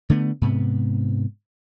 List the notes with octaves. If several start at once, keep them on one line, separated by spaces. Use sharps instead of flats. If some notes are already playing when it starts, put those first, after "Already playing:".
D3 A3 B3
G#2 C3 B3